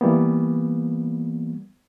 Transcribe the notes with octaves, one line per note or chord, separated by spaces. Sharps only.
E3 G3 A#3 B3